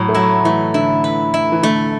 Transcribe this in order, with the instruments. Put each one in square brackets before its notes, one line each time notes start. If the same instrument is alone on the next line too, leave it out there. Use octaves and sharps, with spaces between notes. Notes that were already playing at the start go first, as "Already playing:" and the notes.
Already playing: [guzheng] A2 [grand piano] F#3
[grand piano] A3
[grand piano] F#3 [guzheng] E4
[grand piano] E3 [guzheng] A3
[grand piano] D3 [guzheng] E4
[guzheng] B4
E4
[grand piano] E3
[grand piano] D3 [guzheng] A3